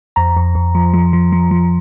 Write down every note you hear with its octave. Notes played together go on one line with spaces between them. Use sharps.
F2 A#5
F2
F2
F3
F3
F3
F3
F3